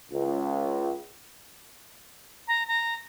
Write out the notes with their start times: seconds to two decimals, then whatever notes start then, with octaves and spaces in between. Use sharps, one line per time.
0.10 C#2
2.48 A#5
2.68 A#5